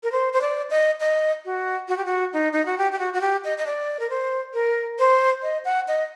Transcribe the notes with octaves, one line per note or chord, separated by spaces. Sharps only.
A#4
C5
C5
D5
D#5
D#5
F#4
F#4
G4
F#4
D#4
D#4
F#4
G4
G4
F#4
F#4
G4
D#5
D#5
D5
A#4
C5
A#4
C5
D#5
F#5
D#5